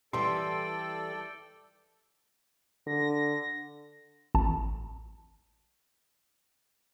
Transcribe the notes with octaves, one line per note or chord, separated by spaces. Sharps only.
E3 G3 A4 D5 G5 C6
D3 A#6
A1 A5